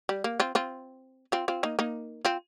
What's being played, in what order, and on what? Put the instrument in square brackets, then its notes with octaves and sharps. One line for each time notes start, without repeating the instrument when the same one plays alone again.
[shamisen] G3
A#3
C4 F4
C4 F4
C4 F4
C4 F4
A#3 D#4
A#3 D#4
C4 F4